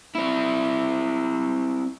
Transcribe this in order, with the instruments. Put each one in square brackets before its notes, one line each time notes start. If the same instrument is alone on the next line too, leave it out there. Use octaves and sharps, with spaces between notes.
[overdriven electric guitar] C4 E4